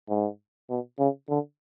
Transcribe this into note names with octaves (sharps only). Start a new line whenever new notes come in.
G#2
B2
C#3
D3